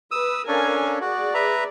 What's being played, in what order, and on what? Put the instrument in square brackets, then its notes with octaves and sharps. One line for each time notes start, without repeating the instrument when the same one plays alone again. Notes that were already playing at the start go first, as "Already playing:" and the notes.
[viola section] B4 [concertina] D#6 E6
[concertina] C#4 D4 A4 [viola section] A#4 F5 G#5
[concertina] F#4 [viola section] G#4 D5
[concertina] B4 E5 A#5